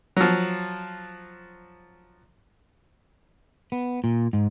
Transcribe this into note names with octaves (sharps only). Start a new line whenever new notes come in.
F3 F#3
B3
A#2
G#2